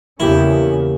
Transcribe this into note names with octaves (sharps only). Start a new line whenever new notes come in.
E2 C#3 A#3 C#4 E4 G4